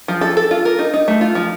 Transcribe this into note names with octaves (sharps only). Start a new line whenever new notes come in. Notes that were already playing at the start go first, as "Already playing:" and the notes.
F3
A4
A4
F4
A#4
D#4
D#4
A3
F4
F3